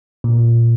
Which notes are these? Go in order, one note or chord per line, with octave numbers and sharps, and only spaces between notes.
A#2